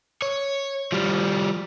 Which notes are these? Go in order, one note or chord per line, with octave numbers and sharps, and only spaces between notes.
C#5
F3 G3